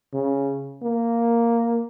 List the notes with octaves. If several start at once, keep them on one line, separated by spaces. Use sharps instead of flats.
C#3
A#3